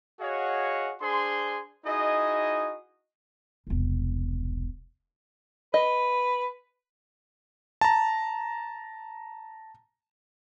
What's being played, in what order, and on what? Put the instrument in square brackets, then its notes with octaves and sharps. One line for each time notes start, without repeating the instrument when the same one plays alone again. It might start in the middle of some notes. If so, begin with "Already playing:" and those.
[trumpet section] F#4 G#4 C#5 D#5 F5 F#5
D4 G#4 C5 C6
D#4 E4 F#4 G#4 D#5
[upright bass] E1 C2
[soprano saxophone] B4 [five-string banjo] D#5
[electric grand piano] A5 A#5